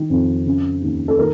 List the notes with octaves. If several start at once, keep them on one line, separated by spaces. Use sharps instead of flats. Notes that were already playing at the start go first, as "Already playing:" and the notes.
Already playing: D#3
F2
C#3
D#2
A4
D#3 A#4